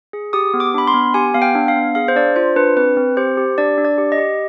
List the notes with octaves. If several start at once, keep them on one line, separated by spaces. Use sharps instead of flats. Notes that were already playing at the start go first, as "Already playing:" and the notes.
G#4
G4 D#6
B3
D6
D4 B5
C6
B3
G4 G#5
B3 F5
G5
D4
F5
B3
G#4 F5
C5
D4 D5
F4 C5
D4 B4
C4 B4
C4
G4 C5
G4
D4 D5
D4
D5
G4
D#5
G4